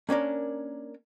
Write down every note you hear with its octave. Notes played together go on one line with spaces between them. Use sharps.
A#3 C#4 D4 A#4